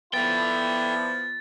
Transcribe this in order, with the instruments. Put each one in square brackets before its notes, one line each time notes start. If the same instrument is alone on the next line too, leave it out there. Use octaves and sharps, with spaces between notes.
[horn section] F3 B3 [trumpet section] E4 D5 [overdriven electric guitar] A4 G5 [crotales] A6